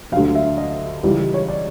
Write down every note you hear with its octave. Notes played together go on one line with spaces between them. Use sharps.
D2 D3 F#3 F5
E5
D#5
C#2 C#3 E3 G3
C#5
D5